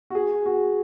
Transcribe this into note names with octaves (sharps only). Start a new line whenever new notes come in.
F#4
G#4
F#4